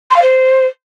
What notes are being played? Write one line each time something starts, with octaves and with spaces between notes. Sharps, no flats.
C6
F5
C5